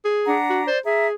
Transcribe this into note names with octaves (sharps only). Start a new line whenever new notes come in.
G#4
D4 F#5 A#5
F#4
C5 D5
G#4 E5 A#5